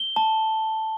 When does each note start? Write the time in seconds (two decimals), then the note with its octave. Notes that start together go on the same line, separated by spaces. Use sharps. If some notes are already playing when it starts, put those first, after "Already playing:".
Already playing: G7
0.16 A5